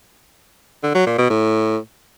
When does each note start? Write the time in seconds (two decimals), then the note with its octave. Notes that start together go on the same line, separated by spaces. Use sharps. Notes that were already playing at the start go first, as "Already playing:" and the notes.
0.83 D3
0.95 F#3
1.07 A#2
1.18 B2
1.30 A2